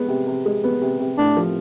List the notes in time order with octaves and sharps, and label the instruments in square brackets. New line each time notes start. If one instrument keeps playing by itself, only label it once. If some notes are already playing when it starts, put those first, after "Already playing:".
Already playing: [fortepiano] G#3 B3
C3
C3
G#3
B3
C3
C3
[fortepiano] A2 [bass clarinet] D4
[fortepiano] F3